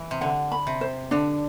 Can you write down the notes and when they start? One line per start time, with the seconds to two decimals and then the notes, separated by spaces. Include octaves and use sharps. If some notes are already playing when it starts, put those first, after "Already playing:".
Already playing: E3
0.11 C3
0.21 D3 F#5
0.52 B5
0.67 C3
0.81 C5
1.11 D3 D4